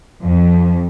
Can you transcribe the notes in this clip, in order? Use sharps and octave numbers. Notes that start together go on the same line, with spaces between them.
F2